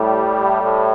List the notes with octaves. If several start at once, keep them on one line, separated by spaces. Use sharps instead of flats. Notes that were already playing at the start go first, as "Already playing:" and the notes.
Already playing: A2 G3
A2